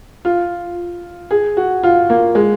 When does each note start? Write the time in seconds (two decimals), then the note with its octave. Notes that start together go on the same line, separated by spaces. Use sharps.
0.25 F4
1.31 G#4
1.57 F#4
1.83 F4
2.10 A#3
2.35 G#3